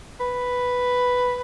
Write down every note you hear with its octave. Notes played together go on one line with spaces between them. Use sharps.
B4